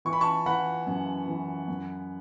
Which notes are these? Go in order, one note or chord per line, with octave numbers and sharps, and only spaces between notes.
E3 C#6
B5
A5 C#6
E3 F#5 B5
F#2
E3
F#2